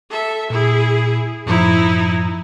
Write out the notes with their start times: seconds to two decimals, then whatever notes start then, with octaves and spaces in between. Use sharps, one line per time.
0.10 A4 E5
0.50 A#2 E4 G#4
1.46 F#2 A2 F3 D#4 E4